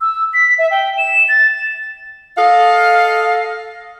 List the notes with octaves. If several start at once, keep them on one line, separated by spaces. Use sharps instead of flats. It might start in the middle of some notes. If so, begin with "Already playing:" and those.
E6
B6
E5
G5
E7
A6
A4 D#5 F5